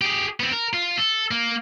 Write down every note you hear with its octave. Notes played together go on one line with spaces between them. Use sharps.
G4 G#4
B3 C4
A#4
F4
A4
A#3